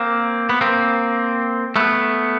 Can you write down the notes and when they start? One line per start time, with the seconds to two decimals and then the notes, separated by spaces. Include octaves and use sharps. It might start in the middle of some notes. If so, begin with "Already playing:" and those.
Already playing: A#3 C4
0.49 B3
0.61 A#3 C4
1.76 A3 B3